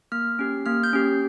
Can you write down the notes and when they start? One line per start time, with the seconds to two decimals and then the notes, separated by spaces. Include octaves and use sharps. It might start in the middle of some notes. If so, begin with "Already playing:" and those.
0.12 A#3 F6
0.39 C#4 G4
0.66 A#3 F6
0.84 G6
0.93 C#4 G4